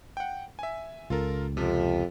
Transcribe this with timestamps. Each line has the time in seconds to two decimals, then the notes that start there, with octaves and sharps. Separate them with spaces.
0.17 F#5 G5
0.59 E5 G#5
1.10 C#2 F4 A4 A#4
1.57 F2 C3 F3